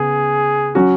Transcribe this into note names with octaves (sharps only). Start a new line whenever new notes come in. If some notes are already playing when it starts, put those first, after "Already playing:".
Already playing: C#3 B3 G#4
F#3 C#4 F#4